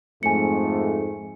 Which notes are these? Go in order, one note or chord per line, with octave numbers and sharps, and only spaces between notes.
F2 G#2 A3 G#5 C#7